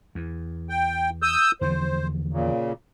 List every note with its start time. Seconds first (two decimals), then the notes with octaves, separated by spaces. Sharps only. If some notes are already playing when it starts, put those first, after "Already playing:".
0.15 E2
0.69 G5
1.22 D#6 E6 G6
1.61 E2 D3 F3 C5
2.33 A#2 C#3